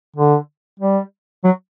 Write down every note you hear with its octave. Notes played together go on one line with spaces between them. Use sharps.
D3
G3
F#3